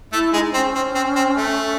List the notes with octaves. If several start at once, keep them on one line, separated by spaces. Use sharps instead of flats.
A3 E4 A4
G#3 D#4 G#4
C4 C#4
C4
C4
C4
A3